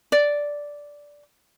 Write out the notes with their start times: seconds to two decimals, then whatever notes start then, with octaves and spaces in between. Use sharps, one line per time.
0.12 D5